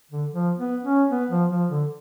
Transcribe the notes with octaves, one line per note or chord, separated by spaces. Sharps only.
D3
F3
B3
C#4
B3
F3
F3
D3